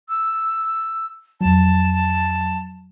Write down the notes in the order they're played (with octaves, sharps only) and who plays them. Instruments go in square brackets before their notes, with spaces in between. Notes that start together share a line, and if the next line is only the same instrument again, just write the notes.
[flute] E6
[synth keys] F2 F#3 [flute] A5